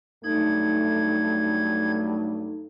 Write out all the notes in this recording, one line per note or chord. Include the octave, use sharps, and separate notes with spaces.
G2 F#3 A3 D#4 G#6